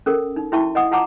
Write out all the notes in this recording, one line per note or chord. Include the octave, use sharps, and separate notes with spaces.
C#4 A4 A#4
D#4
E4 F#4 E5 G5 A5 C#6
D#5 F#5 D#6
F4 F#5 A5 A#5 D6